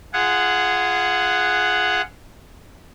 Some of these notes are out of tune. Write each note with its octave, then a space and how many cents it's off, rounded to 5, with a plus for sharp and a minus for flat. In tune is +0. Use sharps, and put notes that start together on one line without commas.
F4 -25 G#4 +0 F#5 +0